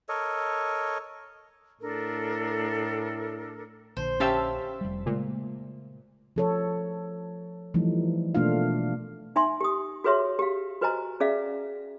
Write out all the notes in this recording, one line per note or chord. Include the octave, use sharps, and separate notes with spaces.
A4 A#4 C#5 D#5
A2 D4 A4 A#4
A#1 D3 C5
C#4 G4 E5 F5 A5 E6
F1 G3
A#2 C#3 G#3 A3
F3 A4 C#5
E3 F3 G3 A3 D#4
B2 A3 A#3 D4 F4 F5
D#4 E5 G#5 C6
G4 D#6
F#4 G#4 B4 C#5 E5 C6
G4 F5
F#4 B4 C5 D#5 G#5 A#5
C#4 G#4 D5 E5 F5